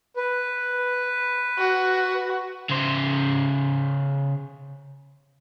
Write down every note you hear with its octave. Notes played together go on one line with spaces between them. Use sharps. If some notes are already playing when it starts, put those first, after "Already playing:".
B4
F#4
C#3 C5